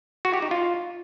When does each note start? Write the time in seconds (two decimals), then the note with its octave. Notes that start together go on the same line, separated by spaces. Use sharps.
0.25 F#4
0.34 G4
0.42 D#4
0.51 F4